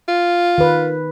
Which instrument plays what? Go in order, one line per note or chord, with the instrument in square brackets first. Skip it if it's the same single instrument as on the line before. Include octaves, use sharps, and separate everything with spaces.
[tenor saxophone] F4
[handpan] D#3 B4